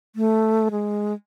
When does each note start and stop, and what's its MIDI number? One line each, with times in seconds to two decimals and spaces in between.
0.16 0.69 57
0.71 1.14 56